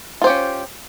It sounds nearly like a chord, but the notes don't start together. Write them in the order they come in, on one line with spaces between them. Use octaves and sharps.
F4 C5 G4 C#4